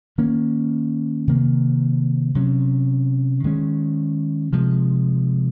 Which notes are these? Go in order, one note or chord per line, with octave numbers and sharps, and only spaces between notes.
D#3 A#3 C#4
C3 D#3 A#3
C3 F#3 C#4
D#3 G#3 C#4
C3 F3 G#3